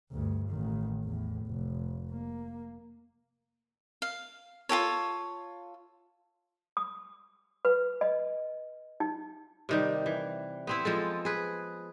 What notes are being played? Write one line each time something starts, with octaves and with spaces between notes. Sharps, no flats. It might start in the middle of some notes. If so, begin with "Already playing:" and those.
D2 G2
A1 D#3
E2 A2
F1
A#3
F5
F4 G4 A4 C#5
D#6
B4
D#5
D#4
C3 D#3 G3
E3
B3 C4 E4
F3 G#3 A4
G#4 B4